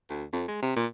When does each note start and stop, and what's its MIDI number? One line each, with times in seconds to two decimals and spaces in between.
0.10 0.24 38
0.33 0.44 41
0.48 0.57 56
0.62 0.73 48
0.76 0.86 46